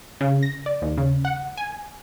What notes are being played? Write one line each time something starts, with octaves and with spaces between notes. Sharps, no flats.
C#3
A#6
D5
D#2
C#3
F#5
G#5